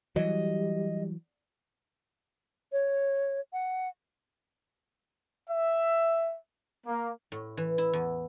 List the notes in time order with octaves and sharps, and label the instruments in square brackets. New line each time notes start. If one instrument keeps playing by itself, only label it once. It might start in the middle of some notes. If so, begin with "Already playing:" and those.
[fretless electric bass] E3 F#3 [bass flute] G3 [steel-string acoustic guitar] D#5
[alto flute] C#5
F#5
[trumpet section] E5
A#3
[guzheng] A2
E3
E4
E2